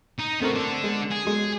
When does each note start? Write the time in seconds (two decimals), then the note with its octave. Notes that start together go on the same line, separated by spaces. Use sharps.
0.19 D#4
0.41 A3 B3 C4 F#4 A#4
0.55 D4 A4
0.83 G#3
1.11 G#4
1.25 F#3 G#3